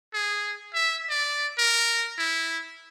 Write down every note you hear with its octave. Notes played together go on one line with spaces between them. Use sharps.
G#4
E5
D5
A#4
E4